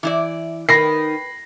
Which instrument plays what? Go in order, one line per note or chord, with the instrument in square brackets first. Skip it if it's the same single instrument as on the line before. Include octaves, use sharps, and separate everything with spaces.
[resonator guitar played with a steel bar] E3 E4 D5
[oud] D#3 [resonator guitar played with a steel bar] B4 [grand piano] B5 A#6 C7